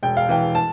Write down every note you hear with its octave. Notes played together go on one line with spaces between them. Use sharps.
E1 G5
F5
E3 G5
A5